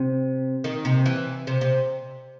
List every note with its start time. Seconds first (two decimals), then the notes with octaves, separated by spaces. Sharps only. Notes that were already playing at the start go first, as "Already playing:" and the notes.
Already playing: C3
0.64 D#3
0.85 C3
1.06 E3
1.47 C3
1.61 C3